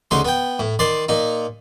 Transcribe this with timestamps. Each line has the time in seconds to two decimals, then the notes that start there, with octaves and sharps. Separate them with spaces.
0.11 D2 C#3 D#4 C6
0.25 B3 G5
0.59 A2
0.79 D#3 D5 C6
1.09 A#2 D#4